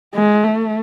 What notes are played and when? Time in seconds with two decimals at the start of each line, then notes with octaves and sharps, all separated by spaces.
0.14 G#3
0.44 A3